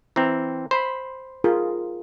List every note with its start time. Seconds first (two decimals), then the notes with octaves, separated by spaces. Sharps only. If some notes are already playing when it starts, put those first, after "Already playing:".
0.16 E3 C4 A#5
0.71 C5 B5 C6
1.44 F4 G#4 A#4